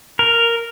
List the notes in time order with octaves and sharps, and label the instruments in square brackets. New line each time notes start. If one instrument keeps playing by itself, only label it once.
[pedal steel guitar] A#4